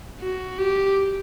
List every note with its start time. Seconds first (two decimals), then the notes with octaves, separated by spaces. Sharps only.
0.21 F#4
0.59 G4